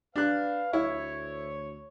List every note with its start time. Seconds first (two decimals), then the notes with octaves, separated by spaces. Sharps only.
0.16 D4 B4 F5 F#6
0.73 D2 E4 C#5